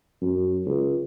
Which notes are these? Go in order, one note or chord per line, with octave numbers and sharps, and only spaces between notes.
F#2
C#2